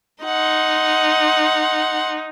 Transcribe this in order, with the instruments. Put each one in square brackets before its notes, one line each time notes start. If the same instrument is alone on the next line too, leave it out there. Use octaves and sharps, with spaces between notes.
[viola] D#4 [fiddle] F#5 C6